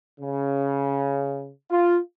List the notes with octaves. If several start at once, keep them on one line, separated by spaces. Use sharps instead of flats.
C#3
F4